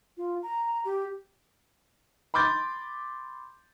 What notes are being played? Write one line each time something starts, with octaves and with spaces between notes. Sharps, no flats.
F4
A#5
G4
B5 C6 D6 G6 A6